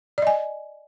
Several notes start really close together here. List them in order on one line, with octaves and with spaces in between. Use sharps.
D5 D#5 G#5